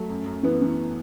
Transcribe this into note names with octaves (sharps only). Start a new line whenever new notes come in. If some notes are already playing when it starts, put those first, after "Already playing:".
Already playing: F#3 A3
F#2
F#2
E3 B3
E3